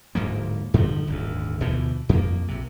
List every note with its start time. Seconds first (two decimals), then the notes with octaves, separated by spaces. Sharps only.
0.15 D1 G#2 F3 A#3
0.74 G2 D3 D#3 F3
1.07 D#1 G#1 D2
1.60 D2 B2 E3 F3
2.09 F2 F3 A#3
2.48 A#1 C3